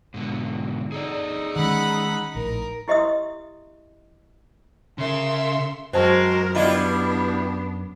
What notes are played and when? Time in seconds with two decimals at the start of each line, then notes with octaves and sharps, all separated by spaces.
0.14 G#2 B2 D3
0.92 D#4 G#4 A4 D5
1.56 D#3 G#3 C#4 F#5 B5
2.35 A#1 A2 A#4
2.88 E4 G4 D#5 E5 C6 D#6
4.98 C#3 A#4 E5 C6
5.93 F#2 G#3 C4 F#4 A#4 C5 A5 C#6
6.55 G3 B3 D4 E4 F4 D5 D#5 D6